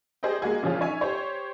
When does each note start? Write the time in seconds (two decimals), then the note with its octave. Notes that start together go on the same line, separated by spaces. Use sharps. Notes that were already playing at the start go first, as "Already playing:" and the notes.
0.23 G4 G#4 C5 D5 D#5 G5
0.42 G#3 A#3 F#4 G#4
0.63 A#2 C#3 E3 F3 C#4 F4
0.80 C#4 D#4 C#5 E5 G#5
1.01 G4 C5 C#5